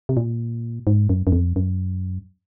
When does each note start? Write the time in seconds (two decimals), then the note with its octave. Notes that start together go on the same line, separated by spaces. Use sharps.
0.09 C3
0.17 A#2
0.87 G#2
1.09 F#2
1.27 F#2
1.32 F2
1.56 F#2